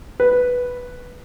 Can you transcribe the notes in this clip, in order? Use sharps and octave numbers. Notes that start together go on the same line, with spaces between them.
B4